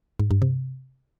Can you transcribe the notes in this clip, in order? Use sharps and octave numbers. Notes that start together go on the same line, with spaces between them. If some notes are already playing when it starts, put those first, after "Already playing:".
G#2
G2
C3